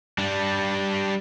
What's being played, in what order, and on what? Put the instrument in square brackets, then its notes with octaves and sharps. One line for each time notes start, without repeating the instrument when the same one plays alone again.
[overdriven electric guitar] G3 D4